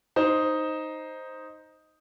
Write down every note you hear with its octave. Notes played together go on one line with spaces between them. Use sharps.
D#4 C5